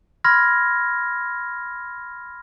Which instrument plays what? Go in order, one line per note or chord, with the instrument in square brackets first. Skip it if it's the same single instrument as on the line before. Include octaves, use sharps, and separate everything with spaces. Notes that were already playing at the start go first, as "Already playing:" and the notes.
[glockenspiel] B5 C6 F6 G#6 A#6